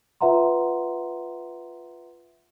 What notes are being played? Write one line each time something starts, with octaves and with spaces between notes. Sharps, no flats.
F4 B4 E5 F#5 A#5 C6